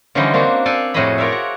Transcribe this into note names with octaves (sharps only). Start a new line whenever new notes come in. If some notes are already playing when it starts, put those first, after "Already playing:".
D3 E3 F3 G3 C#4 D#4
A#3 C4 D4 F#4
A4 D5 F5 G5 G#5
F2 A2 F#4 G#4 D#5 B5
F4 A#4 C#5 D5 E5
F#4